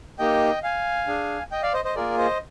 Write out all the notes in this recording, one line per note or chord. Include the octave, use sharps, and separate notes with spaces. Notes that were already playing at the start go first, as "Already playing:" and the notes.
A#3 D#4 G4 D#5 G5
F5 G#5
D4 G#4
D#5 G5
D5 F5
C5 D#5
C5 D#5
A#3 F4 G#4 A#4 D5
C5 D#5